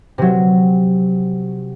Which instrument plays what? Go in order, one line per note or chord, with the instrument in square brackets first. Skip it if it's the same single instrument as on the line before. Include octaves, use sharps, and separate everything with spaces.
[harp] C3 F#3